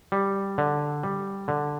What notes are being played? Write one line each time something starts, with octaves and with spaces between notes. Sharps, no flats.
G3
D3
G3
D3